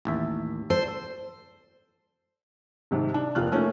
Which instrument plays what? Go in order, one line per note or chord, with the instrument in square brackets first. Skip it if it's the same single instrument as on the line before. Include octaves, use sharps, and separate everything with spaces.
[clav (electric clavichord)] A1 D#2 E5
[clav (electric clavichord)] A4 [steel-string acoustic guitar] C5
[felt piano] C2 G#2 C3 D#3
D4
F1 A#3 F4 F6 F#6
A3 A#3 C#4 D#4 F4